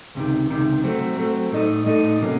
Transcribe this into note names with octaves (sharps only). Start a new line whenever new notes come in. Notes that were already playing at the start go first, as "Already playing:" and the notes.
C#2 C3 D#3
C#2 C3 D#3
F#3 A3 C4
F#3 A3 C4
A2 A3 D#4 A4 D#5
A2 A3 D#4 A4 D#5
C3 F#3 A#3 C#4